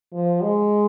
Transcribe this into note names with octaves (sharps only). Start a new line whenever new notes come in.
F3
G#3